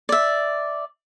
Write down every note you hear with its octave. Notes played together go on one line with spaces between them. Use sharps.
D5 E5